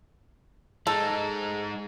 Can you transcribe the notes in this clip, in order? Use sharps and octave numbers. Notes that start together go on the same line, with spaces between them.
G#3 D#4 A4